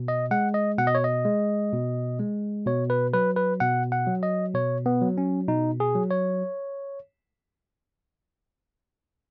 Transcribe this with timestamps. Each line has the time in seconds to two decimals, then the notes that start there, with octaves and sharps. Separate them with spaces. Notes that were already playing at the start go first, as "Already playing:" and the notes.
Already playing: B2
0.08 D#5
0.31 G#3 F#5
0.54 D#5
0.78 B2 F#5
0.87 D#5
0.95 C#5
1.04 D#5
1.25 G#3
1.73 B2
2.20 G#3
2.66 B2 C#5
2.90 B4
3.13 F#3 B4
3.36 B4
3.60 B2 F#5
3.92 F#5
4.07 F#3
4.23 D#5
4.54 B2 C#5
4.86 B3
5.01 F#3
5.18 C#4
5.48 B2 D#4
5.80 G#4
5.95 F#3
6.11 C#5